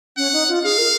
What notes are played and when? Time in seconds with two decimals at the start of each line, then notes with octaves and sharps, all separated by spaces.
0.17 C#4 F#5
0.33 D#4
0.48 F4
0.64 G#4 F5
0.78 A#4